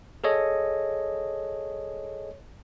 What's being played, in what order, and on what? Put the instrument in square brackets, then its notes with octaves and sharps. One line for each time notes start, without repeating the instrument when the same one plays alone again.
[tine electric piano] G#4 A4 C#5 D#5